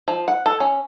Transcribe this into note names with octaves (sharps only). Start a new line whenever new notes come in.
F3
F#5
A4
C#4